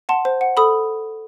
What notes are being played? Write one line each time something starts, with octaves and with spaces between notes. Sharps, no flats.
F#5 A5 C6
C5
F#5
A4 B5 D#6